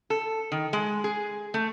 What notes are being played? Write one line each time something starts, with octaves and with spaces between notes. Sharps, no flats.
A4
D#3
G#3
G#4
A3